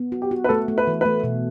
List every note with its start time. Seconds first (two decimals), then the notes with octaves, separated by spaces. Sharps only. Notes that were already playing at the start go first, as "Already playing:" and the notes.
Already playing: B3
0.12 F#4
0.22 G4
0.31 F#4
0.44 B4
0.49 A3 A4
0.68 A3
0.78 B4
0.87 E3
1.01 A3 B4
1.24 B2